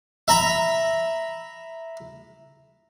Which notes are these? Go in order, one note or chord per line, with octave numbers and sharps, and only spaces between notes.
E5 A#5 B5